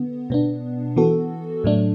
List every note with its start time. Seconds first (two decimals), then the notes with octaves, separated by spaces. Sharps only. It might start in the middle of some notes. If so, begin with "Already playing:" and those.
Already playing: D3 B3
0.30 B2 B3 D4
0.96 E3 B3 F#4 A4
1.64 A2 F#3 A3 D4